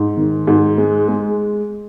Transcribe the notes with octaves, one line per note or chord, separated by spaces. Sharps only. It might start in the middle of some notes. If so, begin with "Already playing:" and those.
Already playing: G#2
D#3
G#2
G#3
G#3